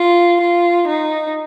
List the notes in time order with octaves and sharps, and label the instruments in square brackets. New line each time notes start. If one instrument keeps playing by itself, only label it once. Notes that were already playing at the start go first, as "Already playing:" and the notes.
Already playing: [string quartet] F4
F4
D#4